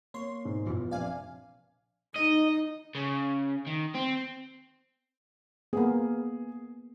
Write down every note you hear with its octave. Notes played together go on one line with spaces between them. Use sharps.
A#3 C#5 C6
E1 G#2
F#2 B2 E3 F4
A#1 C3 D5 F5 G#5
D#4 D#5
C#3
D#3
C4
A#3 B3 G#4